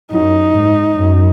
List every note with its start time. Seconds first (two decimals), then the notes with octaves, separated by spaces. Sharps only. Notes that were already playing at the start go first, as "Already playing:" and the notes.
0.11 F#2 D#4
0.53 G#2
0.95 F#2